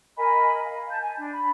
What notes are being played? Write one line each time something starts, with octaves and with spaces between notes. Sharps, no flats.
A#4 D#5 G#5 B5
F5
A5 G6
G#5
D4
B5